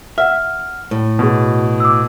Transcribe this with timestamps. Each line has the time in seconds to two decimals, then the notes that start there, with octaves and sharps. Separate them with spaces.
0.18 E5 F#5 F6
0.91 A2
1.19 B2 F#4 G#4
1.80 D6 E6